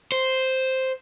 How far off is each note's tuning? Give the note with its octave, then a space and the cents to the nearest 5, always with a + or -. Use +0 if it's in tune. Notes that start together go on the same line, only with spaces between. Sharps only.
C5 +0